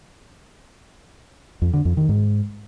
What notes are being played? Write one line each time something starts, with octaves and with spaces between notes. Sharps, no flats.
F2
D3
F2
D#3
G#2